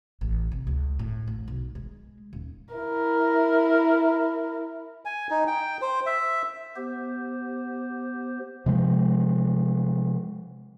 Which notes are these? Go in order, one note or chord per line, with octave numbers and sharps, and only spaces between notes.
A1
C3
C#2
A2
A1
B1
G#3
D#1
E4 A#4
G#5
D#4
G5
C5
E5
B3 G4 C5
C3 F3 G#3